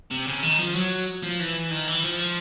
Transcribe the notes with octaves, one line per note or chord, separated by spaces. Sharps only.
C3
C#3
D#3
F3
F#3
F3
E3
D#3
E3
F3